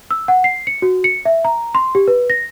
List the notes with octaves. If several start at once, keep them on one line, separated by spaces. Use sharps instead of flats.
E6
F#5
C7
C#7
F#4
C#7
E5
A#5
C6
G4
B4
A#6